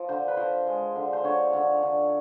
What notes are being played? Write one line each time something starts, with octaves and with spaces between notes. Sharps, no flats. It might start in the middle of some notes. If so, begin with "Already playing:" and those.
Already playing: F3
D3 C5
B4
F3 C5
G#3
D3
C5
D3 C#5
D3
D3